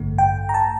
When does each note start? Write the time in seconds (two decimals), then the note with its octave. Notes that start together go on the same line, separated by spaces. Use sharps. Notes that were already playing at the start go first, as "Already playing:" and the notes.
Already playing: A1 G2 D3 A3
0.19 G5
0.49 A#5
0.54 A5